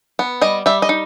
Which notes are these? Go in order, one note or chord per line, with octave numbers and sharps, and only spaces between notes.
B3
G3 D#5
G3 E5
D#5
D#4